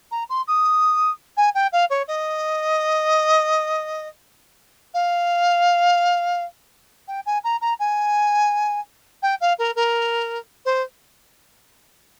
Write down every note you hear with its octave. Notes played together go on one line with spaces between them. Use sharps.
A#5
C6
D#6
G#5
G5
F5
C#5
D#5
F5
G5
G#5
A#5
A#5
G#5
G5
F5
A#4
A#4
C5